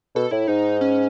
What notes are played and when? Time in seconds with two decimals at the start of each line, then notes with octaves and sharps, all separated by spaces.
0.15 B2 A4
0.31 A2 E4
0.48 G#2 D#4
0.81 C#4